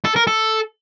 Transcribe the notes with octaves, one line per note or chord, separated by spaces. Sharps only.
A4
A#4
A4